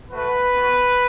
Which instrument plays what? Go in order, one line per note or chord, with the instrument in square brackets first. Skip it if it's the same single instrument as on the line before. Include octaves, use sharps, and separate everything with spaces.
[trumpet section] A3 F#4 B4
B3
F#4